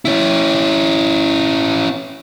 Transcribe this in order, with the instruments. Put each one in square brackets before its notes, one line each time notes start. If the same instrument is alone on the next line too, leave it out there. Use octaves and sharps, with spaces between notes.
[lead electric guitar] C#4 E4